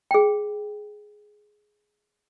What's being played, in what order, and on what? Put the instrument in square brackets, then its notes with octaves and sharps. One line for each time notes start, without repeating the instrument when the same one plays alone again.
[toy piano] G#4 G5